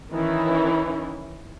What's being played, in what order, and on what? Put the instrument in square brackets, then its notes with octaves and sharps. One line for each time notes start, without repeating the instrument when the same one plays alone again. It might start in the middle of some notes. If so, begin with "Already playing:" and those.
[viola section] D#3 E3 C#4 E4